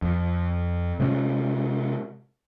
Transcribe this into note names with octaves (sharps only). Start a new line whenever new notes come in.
F2
C3 G#3 A#3 C#4